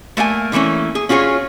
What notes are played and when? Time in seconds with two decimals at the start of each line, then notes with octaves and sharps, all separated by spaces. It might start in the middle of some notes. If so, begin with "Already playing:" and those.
0.17 A3 A#3 F5 G#5
0.52 D3 E3 A3 A#3 C#4
0.95 G#4
1.09 C#4 F4 F#4 G#4 C#5